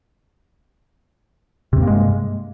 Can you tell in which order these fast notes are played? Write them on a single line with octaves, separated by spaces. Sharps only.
C3 G2 A#3 G#3